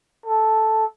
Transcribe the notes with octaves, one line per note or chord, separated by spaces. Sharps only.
A4